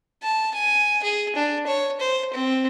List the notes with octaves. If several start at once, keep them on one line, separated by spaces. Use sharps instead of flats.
A5
G#5
G#4
D4
C#5
C5
C4